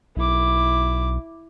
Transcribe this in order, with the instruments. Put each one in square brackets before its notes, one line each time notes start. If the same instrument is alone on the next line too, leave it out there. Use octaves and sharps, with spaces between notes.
[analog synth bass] B1 [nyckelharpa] E4 D6